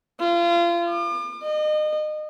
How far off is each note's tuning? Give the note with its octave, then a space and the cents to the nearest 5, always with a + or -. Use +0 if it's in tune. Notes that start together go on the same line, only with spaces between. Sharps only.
F4 -30
D6 +40
D#5 -30